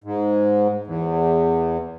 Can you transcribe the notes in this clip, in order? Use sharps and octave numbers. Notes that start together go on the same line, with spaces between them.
G#2
E2